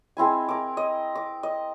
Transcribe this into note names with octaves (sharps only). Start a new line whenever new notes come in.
G#3 C4 E4 G#5
A#4 D6
D#5
D6
D#5